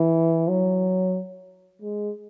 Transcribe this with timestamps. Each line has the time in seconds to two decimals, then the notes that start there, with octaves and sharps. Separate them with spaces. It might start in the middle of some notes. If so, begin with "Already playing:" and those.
Already playing: E3
0.48 F#3
1.82 G#3